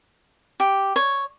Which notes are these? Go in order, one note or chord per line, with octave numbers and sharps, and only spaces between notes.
G4
C#5